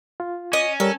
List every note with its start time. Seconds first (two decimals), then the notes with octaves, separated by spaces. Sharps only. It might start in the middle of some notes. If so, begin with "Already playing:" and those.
0.20 F4
0.53 C#4 D#5
0.80 G3 A4 A#4 C#5